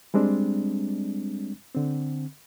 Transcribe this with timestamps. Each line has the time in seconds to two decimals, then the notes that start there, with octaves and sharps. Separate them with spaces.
0.14 G3 G#3 C4 D4
1.74 D3 C4